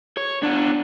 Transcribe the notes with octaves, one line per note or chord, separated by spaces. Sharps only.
C#5
B3 D4